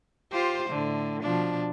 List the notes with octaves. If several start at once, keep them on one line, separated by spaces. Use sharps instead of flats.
F4 G4 C5
A2 D3
B2 F3 D4